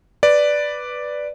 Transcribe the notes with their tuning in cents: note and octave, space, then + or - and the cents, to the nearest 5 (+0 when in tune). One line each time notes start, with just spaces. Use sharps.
B4 +0 D5 +0